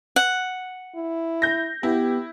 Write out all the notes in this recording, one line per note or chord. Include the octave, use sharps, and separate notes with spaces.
F#5
E4
G6 A#6
B3 E4 G4